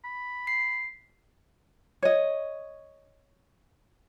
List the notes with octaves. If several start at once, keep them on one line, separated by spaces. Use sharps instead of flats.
B5
C7
C#5 D#5